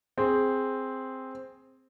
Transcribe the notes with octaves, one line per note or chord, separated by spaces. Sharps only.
C4 G#4